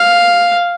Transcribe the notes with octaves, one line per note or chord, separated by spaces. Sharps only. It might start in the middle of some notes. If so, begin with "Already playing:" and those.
Already playing: F5